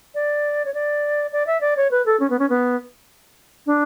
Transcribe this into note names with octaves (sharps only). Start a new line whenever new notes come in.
D5
C#5
D5
D5
E5
D5
C#5
B4
A4
C#4
B3
C#4
B3
D4